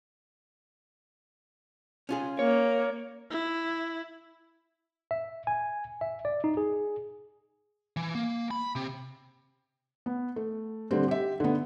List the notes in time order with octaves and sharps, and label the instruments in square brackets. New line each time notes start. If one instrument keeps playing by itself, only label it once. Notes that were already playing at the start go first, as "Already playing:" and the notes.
[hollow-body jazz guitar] C#4 F4 G#4
[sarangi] A#3 [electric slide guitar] C#5
[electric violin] E4
[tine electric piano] E5
G#5
E5
D5
D#4
G#4
[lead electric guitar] E3
A#3
B5
C3
[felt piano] B3
A3
D3 G3 C4
G4 E5
D3 B3